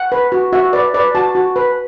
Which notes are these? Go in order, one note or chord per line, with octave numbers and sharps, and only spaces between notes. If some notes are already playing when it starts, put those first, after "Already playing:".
Already playing: F#5
B4
F#4
F#4 E5
B4 D5
B4 D5
F#4 A5
F#4
B4